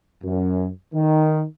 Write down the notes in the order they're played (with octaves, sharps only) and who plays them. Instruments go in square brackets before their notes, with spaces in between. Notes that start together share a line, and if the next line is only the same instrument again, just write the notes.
[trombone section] F#2
D#3